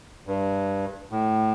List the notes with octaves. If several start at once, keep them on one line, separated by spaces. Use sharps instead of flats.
G2
A2